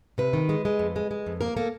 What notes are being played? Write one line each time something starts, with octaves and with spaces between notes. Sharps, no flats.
C3 B4
D#3
G#3
G#3
F2
G#3
G#3
F2
A#3 A#4
A#3 A4